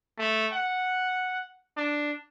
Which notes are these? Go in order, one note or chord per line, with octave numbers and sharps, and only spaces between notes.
A3
F#5
D4